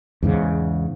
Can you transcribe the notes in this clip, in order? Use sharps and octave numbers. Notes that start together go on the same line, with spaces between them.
E2 G#2 C#3